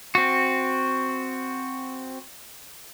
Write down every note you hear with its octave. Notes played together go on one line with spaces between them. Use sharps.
C4 F#4